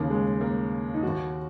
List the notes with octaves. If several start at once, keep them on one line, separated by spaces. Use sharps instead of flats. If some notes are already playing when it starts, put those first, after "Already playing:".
Already playing: D#2 C#3 A#3
G#3
A#3
D#4
D#2 D#3 F#4